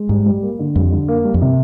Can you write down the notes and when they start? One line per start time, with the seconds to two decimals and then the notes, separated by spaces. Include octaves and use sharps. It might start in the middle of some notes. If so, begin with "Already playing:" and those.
Already playing: G#3
0.09 G#2 G3
0.26 G3
0.42 A#3
0.59 D3
0.76 F2 G3
0.92 D3
1.08 A#3
1.25 G3
1.34 F2
1.41 C3